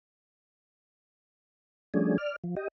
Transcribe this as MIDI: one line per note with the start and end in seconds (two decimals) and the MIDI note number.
1.94 2.17 53
1.94 2.17 55
1.94 2.17 57
1.94 2.17 61
1.94 2.17 62
1.94 2.17 68
2.18 2.36 74
2.18 2.36 89
2.44 2.55 53
2.57 2.68 67
2.57 2.68 75